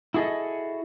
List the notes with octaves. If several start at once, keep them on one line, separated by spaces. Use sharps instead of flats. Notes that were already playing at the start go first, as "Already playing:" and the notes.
E4 F#4 G#4 A4 D#5